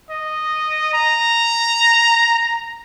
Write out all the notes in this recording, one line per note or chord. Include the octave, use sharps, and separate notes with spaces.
D#5
A#5